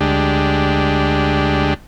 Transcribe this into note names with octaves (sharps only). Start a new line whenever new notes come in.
D2 G#3 D4 G4